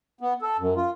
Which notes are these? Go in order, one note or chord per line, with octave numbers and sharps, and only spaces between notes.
B3
A4
F#2
F4